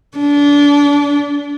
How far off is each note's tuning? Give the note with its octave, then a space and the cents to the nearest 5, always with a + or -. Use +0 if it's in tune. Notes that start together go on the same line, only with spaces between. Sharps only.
D4 -30